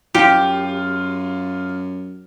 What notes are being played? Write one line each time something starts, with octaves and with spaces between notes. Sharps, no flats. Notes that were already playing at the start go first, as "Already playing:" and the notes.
F#2 F4 G4